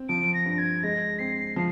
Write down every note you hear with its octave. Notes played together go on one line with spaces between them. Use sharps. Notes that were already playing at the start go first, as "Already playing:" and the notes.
Already playing: C4
F3 D7
A#6
G2
G#6
G#3 A#6
C4 C7
F3 C7